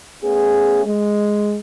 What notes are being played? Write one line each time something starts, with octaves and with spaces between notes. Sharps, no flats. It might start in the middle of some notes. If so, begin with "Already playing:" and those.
A3 B3 C#4 G#4
G#3